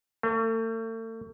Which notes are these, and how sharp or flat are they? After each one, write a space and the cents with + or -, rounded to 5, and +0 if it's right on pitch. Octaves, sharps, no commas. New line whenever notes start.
A3 +40